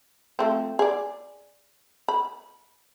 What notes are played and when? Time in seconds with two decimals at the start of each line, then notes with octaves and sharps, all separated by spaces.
0.39 F3 A3 C4
0.79 G#4 D5
2.08 B5